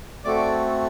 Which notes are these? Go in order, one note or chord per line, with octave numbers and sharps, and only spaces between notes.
A3 C4 F#4 A4 D5 D6